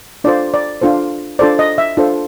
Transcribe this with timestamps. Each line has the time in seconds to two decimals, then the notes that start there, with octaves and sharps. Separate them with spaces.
0.24 D4 F4 A4 C5 D5
0.54 D5
0.81 D4 F4 A4 C5
1.39 D4 F4 A4 C5 D5
1.59 D#5
1.78 E5
1.97 D4 F4 A4 C5